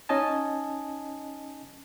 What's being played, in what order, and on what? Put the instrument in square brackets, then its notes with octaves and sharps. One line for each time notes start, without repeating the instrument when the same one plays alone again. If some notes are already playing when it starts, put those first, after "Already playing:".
[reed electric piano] C#4 D#4 D#5 G#5 A5